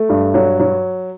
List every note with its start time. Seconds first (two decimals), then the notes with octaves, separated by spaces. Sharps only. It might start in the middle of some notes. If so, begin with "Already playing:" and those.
Already playing: A3
0.09 G2
0.34 F#3
0.60 F#3